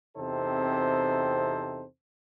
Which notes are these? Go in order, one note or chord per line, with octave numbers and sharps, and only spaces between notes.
E2 C3 C4 D#4 A4 C5